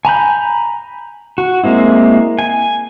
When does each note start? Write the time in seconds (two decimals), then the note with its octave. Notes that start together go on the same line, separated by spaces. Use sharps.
0.05 G#5 A#5 B5 G6
1.38 F#4
1.64 G#3 A#3 C4 E4
2.39 G#5